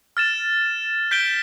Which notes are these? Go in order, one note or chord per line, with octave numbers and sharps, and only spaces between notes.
F6 A6 E7
G6 B6 D7 G7